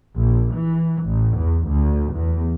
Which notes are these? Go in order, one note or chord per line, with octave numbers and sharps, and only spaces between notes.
A#1
E3
A1
E2
D2
E2